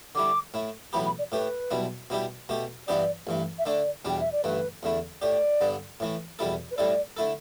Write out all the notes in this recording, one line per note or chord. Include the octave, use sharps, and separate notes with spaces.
D3 G3 E4 D6
A2 A3 E4
B1 A2 E3 B3 G4 B5
B5
D5
A2 A3 G4 B4
B1 B2 G3 E4
B2 G3 E4 G4
B2 A3 G4
G2 E3 B3 D4 G4 D5
A1 G2 E3
E5
D3 A3 D4 A4 D5
E2 B2 G3 D4 G5
E5
D5
A1 G2 D3 A3 B4
E2 D3 A3 E4
A2 A3 G4 D5
G2 D3 B3 D4
A2 E3 A3
E2 B2 G3 E4 A4
B4
A2 G3 E4 A4 D5
D3 A3 E4 A4